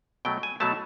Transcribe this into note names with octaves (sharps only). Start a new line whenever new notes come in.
B2 F#3 A3 G5
G#5
B2 F#3 A3 A5